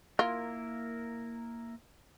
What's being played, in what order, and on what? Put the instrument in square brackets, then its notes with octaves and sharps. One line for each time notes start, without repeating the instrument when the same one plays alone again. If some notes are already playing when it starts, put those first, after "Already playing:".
[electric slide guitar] A#3 E4 A#4 [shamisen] F4